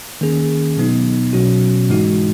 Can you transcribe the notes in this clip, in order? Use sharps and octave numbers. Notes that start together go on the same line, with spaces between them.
D#3 A#3 C#4 G#4
B2 F#3 B3 D#4
B2 F#3 C#4 F#4
G#2 E3 G#3 D#4 F#4